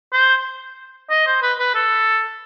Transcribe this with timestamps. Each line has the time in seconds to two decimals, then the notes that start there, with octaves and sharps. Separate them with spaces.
0.13 C5
1.10 D#5
1.26 C5
1.42 B4
1.59 B4
1.75 A4